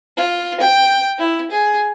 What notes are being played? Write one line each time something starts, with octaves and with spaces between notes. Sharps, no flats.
F4
G5
E4
G#4